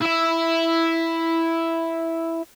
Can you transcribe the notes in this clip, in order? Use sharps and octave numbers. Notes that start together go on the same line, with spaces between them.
E4 E5